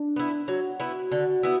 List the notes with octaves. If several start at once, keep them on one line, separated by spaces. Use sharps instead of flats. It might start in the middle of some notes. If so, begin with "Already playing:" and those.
Already playing: D4
B3 E4
F#3 F#4
B3 E4
D3
B3 E4